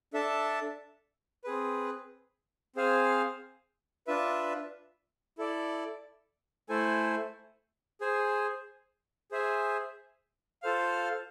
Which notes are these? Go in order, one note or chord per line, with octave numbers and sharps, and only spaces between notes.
D4 A4 E5 A5
C4 G#4 B4
C4 G#4 C5 F5 G#5
D4 F4 B4 E5
E4 A4 D5
A3 E4 A4 C5 G#5
G#4 C5 G#5
G#4 C5 E5 G#5
F4 A4 C5 F5